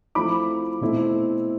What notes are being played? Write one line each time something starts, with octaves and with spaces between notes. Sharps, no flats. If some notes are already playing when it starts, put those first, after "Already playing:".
F3 A3 C4 E4 B5 D6
B2 A3 C4 E4